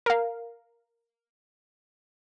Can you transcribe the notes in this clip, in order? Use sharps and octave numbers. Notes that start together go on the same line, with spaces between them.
A#4 F5